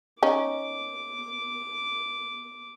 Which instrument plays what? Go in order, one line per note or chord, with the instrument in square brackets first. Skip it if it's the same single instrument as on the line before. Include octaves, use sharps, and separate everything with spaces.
[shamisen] C#4 D#4 [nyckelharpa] D6